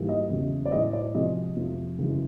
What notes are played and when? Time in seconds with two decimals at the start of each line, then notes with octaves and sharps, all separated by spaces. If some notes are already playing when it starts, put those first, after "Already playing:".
Already playing: G#2 E3 G3 A#3
0.09 D#5
0.30 E2 C#3 F#3 A3
0.65 D5
0.72 A2 E3 G#3 D#5
0.93 D5
1.14 C3 F3 G#3 D#5
1.56 F2 C3 F3 A3
1.98 F#2 C#3 E3 G#3